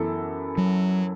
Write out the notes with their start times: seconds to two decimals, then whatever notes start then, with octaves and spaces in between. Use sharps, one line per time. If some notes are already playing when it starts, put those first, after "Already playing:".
Already playing: F#2 E3 B3 A4
0.58 F#3